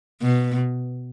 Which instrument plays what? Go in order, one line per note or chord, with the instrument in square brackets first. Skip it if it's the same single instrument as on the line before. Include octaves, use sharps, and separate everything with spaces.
[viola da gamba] B2